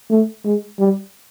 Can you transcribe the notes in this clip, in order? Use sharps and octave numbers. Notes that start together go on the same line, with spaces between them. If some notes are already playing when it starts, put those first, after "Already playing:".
A3
G#3
G3